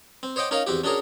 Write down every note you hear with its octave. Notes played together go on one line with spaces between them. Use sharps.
C4
C5 C#5 D#5 F#5 G5 D6
C#4 D#4 A#4 C#5 D#5 F5
E2 C4 F#4 G4
C#4 D4 F#4 G#4 A#4 C#5